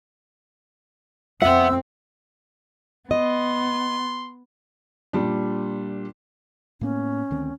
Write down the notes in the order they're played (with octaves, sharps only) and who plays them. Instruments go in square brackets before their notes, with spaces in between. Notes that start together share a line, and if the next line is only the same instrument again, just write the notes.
[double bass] F2 C4 [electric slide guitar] B3 F#5 [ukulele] E5 [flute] E6
[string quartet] B3 [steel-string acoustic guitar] D#5 [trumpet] C6
[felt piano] A#2 G3 D4
[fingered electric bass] A2 A#3 B3 [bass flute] C#4
[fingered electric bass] D2 D#3 C4